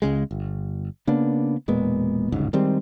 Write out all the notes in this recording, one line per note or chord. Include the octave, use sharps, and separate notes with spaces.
C#2 C#3 G#3
G1
C#3 A#3 B3 D4
E1 A#2 G#3 B3
D1 G1 G#2 C#3
D#3 G3 G#3 C4